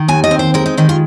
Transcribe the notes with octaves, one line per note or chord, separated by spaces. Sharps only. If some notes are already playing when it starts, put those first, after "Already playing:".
Already playing: D#3
D#2 G#5
D#5
C4
C5
G#3 A#4
D#4
D#3 D#4
F4